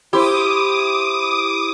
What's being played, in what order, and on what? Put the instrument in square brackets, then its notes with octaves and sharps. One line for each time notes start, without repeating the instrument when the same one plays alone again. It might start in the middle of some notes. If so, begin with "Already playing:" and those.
[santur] E4 C5 [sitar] G4 [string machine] D6 D#6